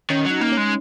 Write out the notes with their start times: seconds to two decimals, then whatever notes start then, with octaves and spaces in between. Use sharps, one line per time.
0.10 D#3 C#4
0.25 F#3
0.31 D#4
0.41 A#3
0.52 C#4
0.57 G#3